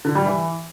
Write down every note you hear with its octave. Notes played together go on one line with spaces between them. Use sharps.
D3
G3
E3